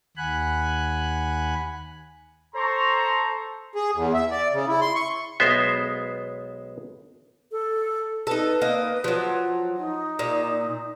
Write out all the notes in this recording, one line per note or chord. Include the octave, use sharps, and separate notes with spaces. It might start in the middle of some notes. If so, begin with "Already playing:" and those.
D#2 F#5 G#5 B5 F#6
A4 C5 A#5 C6 C#6
G#4
E2
E5
D5
C#3
E4
C6
C#6
B1 G#3 B3 C5 E5
A4
D#4 A4 B4
A#3 D#5
F3 F#3
D#4
A#2